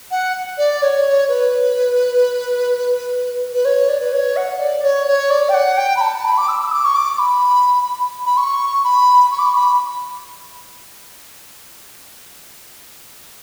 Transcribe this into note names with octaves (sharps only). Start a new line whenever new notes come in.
F#5
D5
C#5
B4
B4
C#5
D5
B4
C#5
F#5
D5
C#5
C#5
D5
G5
F#5
G5
B5
A5
B5
D6
E6
E6
D6
C#6
D6
B5
B5
C#6
B5
C#6
D6
C#6
B5